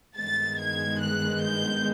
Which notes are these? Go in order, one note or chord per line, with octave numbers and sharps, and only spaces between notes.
G2 D#3 G#3 B3 A6
G#6
F#6
G6